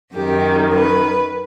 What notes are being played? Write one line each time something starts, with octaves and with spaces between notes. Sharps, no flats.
F#2 D#3 G4
B4